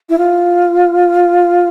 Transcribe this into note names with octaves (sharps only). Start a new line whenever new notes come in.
E4
F4